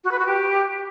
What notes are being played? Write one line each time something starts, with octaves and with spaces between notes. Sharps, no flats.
F#4
B4
F#4
G4